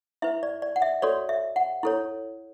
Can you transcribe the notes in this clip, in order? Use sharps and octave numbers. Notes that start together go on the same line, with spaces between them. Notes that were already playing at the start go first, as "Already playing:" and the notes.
E4 B4 E5
D5
D5
F#5
E5
F#4 A4 C#5 D5
E5
F#5
E4 A4 C#5